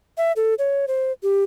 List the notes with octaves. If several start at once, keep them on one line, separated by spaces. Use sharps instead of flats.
E5
A4
C#5
C5
G4